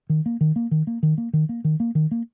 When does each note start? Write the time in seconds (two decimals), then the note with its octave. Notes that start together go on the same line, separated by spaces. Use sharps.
0.10 D#3
0.26 A#3
0.41 D#3
0.56 A#3
0.71 D#3
0.87 A#3
1.03 D#3
1.18 A#3
1.33 D#3
1.49 A#3
1.64 D#3
1.80 A#3
1.95 D#3
2.11 A#3